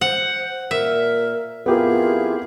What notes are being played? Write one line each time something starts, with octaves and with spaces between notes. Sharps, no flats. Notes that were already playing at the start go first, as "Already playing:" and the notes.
C5 F#5
A#2 A#4 E5
F2 B3 E4 F4 G4 G#4 A#4